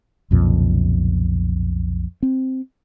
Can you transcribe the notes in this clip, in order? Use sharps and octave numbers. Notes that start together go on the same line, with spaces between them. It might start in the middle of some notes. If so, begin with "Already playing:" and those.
B1 F2 A#2 C#3
C4